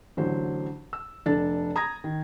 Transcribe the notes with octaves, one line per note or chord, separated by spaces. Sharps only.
A1 D3 F#3 C5
E6
F1 D4 A4 A6
A#5 D#6 G#6 A#6
D#3